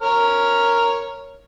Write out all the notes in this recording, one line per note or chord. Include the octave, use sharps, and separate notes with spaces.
A#4 C#5 F6